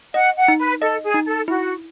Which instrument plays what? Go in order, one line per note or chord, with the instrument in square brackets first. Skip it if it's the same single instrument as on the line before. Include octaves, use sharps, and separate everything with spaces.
[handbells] D#5 [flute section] F#5
[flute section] F#5
[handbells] D#4
[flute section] B4
[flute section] A4 [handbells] D#5
[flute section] G#4
[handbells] D#4
[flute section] A4
[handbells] E4 [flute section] F#4